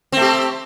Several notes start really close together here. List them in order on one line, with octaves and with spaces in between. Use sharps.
C4 A3 G4